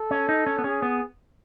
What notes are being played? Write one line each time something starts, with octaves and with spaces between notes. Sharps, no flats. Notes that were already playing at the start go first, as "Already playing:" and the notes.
Already playing: A4
C#4
D#4
C#4
B3
C#4 G#4
B3